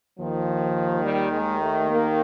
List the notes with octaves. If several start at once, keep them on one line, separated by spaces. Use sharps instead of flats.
D#2 D#3 F3
G3
G#3
A3
A#3